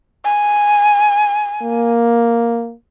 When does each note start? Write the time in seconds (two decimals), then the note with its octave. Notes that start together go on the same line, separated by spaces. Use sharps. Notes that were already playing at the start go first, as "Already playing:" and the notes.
0.25 G#5
1.62 A#3